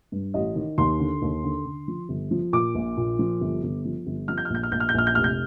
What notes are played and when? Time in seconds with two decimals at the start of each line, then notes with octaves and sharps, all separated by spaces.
0.12 G2
0.34 A1 D#5
0.56 D#3
0.78 D#2 C6
1.00 D3
1.22 D#2
1.44 D3
1.65 D3
1.88 F3
2.09 G1
2.31 F3
2.53 A#2 D6
2.75 A#1
2.97 A#2
3.19 F3
3.41 G1
3.63 G1
3.85 F3
4.07 G1
4.28 F3 F6
4.38 G6
4.45 F6
4.50 A#1 G6
4.63 F6
4.72 A#1 G6
4.80 F6
4.89 G6
4.94 A#1 F6
5.07 G6
5.15 F1 F6
5.24 G6